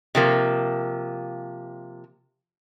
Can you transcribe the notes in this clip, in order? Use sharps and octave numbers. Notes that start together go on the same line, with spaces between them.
C3 F3 A#3